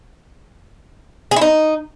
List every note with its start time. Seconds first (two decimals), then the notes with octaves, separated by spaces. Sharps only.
1.31 G#4
1.36 E4
1.41 D#4